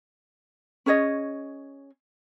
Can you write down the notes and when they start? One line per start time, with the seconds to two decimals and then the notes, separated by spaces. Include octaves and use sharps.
0.86 C#4 G#4 C#5 D#5